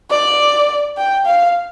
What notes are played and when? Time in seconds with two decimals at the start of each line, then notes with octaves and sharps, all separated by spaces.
0.10 D5
0.97 G5
1.26 F5